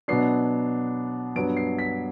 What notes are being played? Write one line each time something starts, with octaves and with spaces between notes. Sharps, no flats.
B2 F#3 B3 D4 C7
G2 F#3 B3 D4 D7
C7
B6